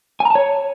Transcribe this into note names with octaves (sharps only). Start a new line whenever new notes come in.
G#5
A#5
A5
C#5